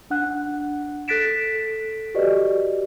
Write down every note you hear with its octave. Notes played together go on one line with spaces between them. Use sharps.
D4 F#5 F#6
A4 F#6 A6 B6 D7 E7
F#4 G4 B4 D5 D#5